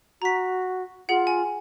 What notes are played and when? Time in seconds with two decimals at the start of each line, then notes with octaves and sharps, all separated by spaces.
0.22 F#4 A#5 B6
1.09 F4 G#4 F#5
1.27 G#5